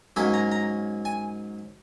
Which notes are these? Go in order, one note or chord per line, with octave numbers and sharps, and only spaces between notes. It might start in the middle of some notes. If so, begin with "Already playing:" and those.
G#2 F#3 A#3 C#4 B5
A#5
A#5
G#5